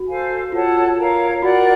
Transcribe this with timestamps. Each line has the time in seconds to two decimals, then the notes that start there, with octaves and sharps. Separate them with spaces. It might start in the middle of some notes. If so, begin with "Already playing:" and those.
Already playing: F#4
0.08 A4 C5 F5 G#5
0.52 F4 A4 C#5 F#5 A5
0.97 A#4 C#5 F5 A#5
1.42 F#4 A#4 D5 F#5